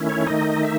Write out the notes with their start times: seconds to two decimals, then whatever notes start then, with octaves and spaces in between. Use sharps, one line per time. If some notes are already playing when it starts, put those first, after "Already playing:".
Already playing: D#3 A3 C#4 E4
0.09 C#5
0.27 D#3 A3 D#4 D#5
0.63 E5